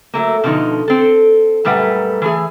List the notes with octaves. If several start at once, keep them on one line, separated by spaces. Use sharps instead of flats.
F#3 A3 A#3
B2 D3 F3 D#4
C4 A4
F#2 A#2 G3 A3 B4 F#5
E3 A3 G#4